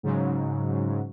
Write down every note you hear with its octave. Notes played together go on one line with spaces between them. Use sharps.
G#2 C#3 F#3